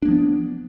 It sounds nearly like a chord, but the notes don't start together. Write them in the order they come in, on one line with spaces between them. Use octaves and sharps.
D4 A#3 F3 B3